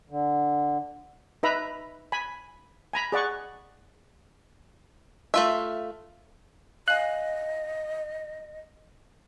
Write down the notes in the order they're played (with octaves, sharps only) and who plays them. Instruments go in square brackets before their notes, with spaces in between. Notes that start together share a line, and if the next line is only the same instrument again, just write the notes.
[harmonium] D3
[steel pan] D#4 B4 E5 A#5 B5
G#5 B5
G#5 A#5 B5
G#4 D5 F#5 C#6
[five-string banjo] A3 F4 E5
[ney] D#5 [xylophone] F5 G#5 [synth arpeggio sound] F#6